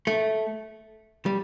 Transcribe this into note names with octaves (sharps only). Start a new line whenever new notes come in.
A3
G3